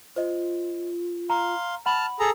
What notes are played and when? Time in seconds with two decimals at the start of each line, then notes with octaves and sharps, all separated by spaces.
0.16 F4 C5 D#5
1.30 F5 A#5 C6
1.86 F#5 A5 B5 F6 F#7
2.20 G#4 A4 A#5